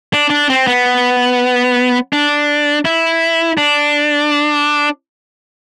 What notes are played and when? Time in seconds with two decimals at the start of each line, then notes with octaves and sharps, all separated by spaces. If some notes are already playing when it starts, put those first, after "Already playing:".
0.13 D4
0.30 D4
0.49 C4
0.67 B3
2.13 D4
2.85 E4
3.58 D4